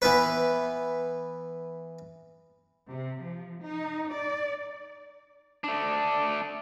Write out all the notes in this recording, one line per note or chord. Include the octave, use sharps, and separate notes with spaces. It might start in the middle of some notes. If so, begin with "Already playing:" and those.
E3 B3 B4
C3
F3
D#4
D5
A3 D4